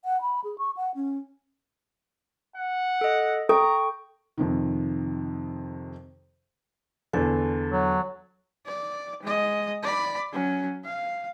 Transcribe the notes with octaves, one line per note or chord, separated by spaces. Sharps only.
F#5
B5
G#4
C#6
F#5
C#4
F#5
A4 D#5
A4 G5 A#5 C#6
F2 C3 D#3
E2 D3 A4
F#3
D5
G#3 D#5
D5 B5
F#3 C#4
F5